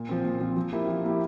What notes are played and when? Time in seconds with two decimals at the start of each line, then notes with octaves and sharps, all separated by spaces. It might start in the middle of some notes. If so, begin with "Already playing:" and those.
Already playing: A#2
0.09 F3 C4
0.24 A#2
0.40 F3 C4
0.57 F3
0.72 A#3 E4 G4
0.88 F3
1.04 A#3 E4 G4